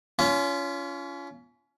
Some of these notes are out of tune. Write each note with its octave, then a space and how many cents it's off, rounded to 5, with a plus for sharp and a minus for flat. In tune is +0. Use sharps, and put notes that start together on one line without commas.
C#4 +30 F4 -20